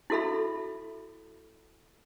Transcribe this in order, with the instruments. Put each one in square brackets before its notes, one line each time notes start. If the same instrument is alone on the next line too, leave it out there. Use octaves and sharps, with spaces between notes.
[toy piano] E4 F#4 A4 E5 B5